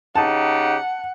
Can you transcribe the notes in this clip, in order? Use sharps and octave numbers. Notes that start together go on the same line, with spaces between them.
C#3 D#4 G4 F#5 A5